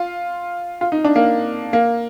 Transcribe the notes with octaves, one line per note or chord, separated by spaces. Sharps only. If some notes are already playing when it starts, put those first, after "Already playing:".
Already playing: F4
F4
D#4
D4
A#3
A#3